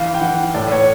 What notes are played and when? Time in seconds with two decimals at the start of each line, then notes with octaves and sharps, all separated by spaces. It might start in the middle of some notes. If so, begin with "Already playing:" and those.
Already playing: E3 F5
0.14 G5
0.21 E3 F#5
0.54 A2 D5
0.71 C#5